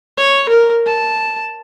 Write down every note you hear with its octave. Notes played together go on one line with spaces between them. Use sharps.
C#5
A#4
A5